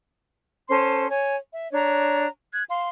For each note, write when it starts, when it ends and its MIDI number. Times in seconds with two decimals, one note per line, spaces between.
0.69 1.06 61
0.69 1.06 69
0.69 1.06 72
0.69 1.06 84
1.09 1.35 73
1.09 1.35 80
1.52 1.69 76
1.73 2.27 62
1.73 2.27 73
1.73 2.27 82
2.52 2.63 90
2.52 2.63 92
2.70 2.90 77
2.70 2.90 84